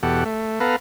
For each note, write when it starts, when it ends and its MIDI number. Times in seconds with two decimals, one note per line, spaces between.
0.03 0.24 40
0.03 0.24 47
0.03 0.24 67
0.03 0.24 69
0.03 0.24 78
0.25 0.59 57
0.60 0.76 59
0.60 0.76 69
0.60 0.76 71
0.60 0.76 77
0.60 0.76 82